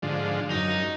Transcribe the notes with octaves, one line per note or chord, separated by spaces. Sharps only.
G#2 D3 F3
F#2 D#4